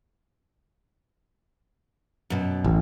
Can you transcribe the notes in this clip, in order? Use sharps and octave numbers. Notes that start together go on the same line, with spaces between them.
F#2 B2
A1